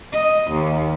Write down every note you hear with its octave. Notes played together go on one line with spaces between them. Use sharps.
D#5
D#2